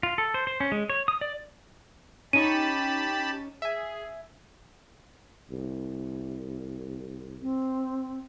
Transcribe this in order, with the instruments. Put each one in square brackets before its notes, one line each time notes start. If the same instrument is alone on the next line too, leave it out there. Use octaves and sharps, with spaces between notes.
[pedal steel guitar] F4
A4
C5
C5
C#4
G#3
C#5
D#6
D5
[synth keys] C#4 D#4 C#6 [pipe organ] G4 A5 B5 [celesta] D#7
[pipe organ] G#4 [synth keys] E5 G#5
[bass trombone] C2
[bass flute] C4